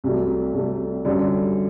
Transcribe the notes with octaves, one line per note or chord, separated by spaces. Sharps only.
C2 C3 F#3 A3
C2 C3 F#3 A3
F#2 D3 G3